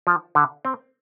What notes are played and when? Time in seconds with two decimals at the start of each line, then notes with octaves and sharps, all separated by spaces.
0.07 F3
0.35 D3
0.65 C4